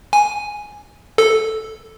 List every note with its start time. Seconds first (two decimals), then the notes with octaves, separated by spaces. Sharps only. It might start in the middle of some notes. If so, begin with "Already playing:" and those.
0.13 G#5
1.18 A4